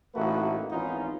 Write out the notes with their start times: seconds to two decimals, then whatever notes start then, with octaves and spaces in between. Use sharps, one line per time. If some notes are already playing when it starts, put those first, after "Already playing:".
0.15 A1 A3 A#3 D#4 F#4 B4
0.71 G#1 E2 B3 C#4 D#4 F4